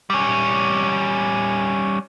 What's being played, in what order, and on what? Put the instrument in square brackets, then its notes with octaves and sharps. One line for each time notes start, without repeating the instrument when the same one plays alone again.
[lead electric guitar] G3 C#4